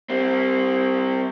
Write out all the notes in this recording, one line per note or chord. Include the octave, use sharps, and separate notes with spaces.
G3 C4